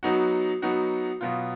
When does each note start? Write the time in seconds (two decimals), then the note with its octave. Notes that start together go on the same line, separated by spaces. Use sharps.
0.03 F#3 B3 D#4 F#4
0.62 F#3 B3 D#4 F#4
1.21 B2 F#3 B3 F4